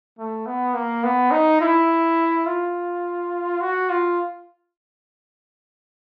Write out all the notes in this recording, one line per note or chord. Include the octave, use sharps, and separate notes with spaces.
A3
B3
A#3
B3
D#4
E4
F4
F#4
F4